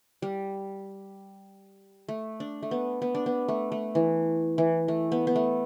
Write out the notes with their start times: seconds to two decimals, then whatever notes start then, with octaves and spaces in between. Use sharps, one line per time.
0.22 G3
2.08 A3
2.40 D4
2.63 A3
2.71 B3
3.02 B3
3.15 D4
3.26 B3
3.48 A3
3.72 A3
3.95 E3
4.58 E3
4.88 A3
5.12 B3
5.27 B3
5.35 A3